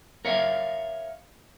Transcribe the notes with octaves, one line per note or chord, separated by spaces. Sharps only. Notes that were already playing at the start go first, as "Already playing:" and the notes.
A#4 C#5 E5 F5